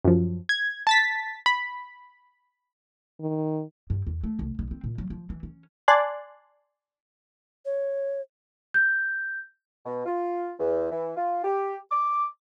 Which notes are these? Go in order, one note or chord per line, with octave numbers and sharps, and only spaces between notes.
F#2 F3
G#6
A5 A6 B6
B5
D#3
G2
E2
A3
C2
B1
C4
A#2
F#3
F3
E3
C#4
D5 G#5 A5 C6 F#6
C#5
G6
B2
F4
E2
E3
F4
G4
D6